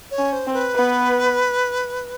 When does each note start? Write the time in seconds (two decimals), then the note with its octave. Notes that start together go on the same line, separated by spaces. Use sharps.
0.11 C#5
0.18 C#4
0.32 C5
0.47 C4
0.54 B4
0.75 B3